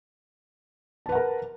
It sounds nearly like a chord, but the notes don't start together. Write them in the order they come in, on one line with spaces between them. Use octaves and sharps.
A5 B4 F#5 A#4